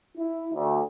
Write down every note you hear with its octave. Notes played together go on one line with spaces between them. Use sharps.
E4
D2